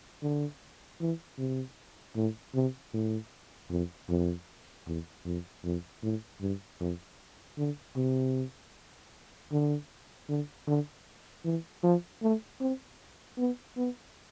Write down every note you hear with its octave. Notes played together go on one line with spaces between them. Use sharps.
D3
E3
C3
A2
C3
A2
F2
F2
E2
F2
F2
A2
G2
F2
D3
C3
D3
D3
D3
E3
F3
A3
C4
B3
B3